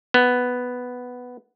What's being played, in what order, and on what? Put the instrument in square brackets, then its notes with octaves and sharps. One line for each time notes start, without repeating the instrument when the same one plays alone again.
[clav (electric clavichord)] B3